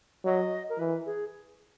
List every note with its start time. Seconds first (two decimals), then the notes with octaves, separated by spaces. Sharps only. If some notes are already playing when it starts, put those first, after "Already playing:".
0.25 F#3 D#5
0.69 A#4
0.79 E3 B4
1.06 G#4